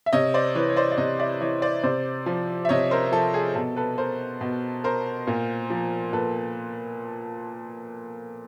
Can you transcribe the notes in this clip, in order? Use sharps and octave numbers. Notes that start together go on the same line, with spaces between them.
E5
C3 C#5 D#5
C5 D5
E3 B4 C#5
C#5
C5 D5
D5
C3 C#5 D#5
D5 E5
E3 C#5 D#5
C5 D5
C3 C5 D5
F3
E5
C3 C#5 D#5
A#4 C5
F3 A4
G#4
B2 A4
A4 B4
A#4 C5
B2
A#4 C5
A#2
F3
A#2 A4 B4